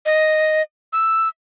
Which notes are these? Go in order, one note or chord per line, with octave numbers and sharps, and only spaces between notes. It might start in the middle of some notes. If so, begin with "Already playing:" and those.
D#5
E6